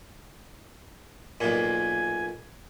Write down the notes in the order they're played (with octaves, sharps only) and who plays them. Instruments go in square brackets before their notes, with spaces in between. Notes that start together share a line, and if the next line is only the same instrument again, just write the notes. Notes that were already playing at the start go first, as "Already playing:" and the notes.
[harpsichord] B1 A#2 [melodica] G#5